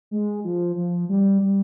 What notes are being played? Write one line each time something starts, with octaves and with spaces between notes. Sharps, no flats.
G#3
F3
F3
G3
G3